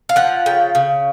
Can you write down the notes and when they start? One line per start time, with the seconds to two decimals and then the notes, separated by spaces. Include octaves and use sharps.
0.09 F5
0.16 F3 F#5
0.46 C#3 G5
0.75 C#3